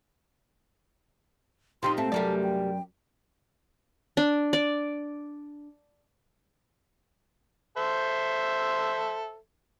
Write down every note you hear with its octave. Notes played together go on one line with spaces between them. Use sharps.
A#2 F3 C4 D#4 G4 C6
A3 C4 A5
F#2 C3 G3 A3 G4 A#4 D5
G5
D4
D5
A4 C5 E5